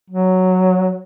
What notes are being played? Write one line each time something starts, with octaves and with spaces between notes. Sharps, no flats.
F#3